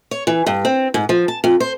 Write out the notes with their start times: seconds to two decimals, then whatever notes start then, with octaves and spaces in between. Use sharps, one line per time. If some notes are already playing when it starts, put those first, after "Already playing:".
0.11 C#5
0.27 E3
0.46 G2
0.65 C4
0.94 G#2
1.09 F3
1.28 A5
1.44 F2
1.60 C5